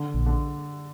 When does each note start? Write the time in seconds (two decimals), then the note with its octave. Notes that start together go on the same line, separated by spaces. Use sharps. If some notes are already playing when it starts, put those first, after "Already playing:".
Already playing: D3
0.14 A#1
0.26 D3